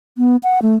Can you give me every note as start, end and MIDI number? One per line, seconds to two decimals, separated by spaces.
0.18 0.36 59
0.43 0.59 78
0.62 0.76 57